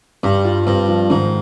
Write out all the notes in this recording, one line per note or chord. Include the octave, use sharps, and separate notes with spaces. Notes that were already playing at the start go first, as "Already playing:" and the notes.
G2 G3
F4
G2 C4
F3
G#2 D#3